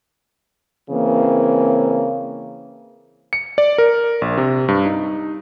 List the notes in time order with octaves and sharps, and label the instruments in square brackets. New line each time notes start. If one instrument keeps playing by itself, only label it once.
[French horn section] C#3 E3 A#3 C4
[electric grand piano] C#7
D5
A#4
A#1
C3
G2
D#4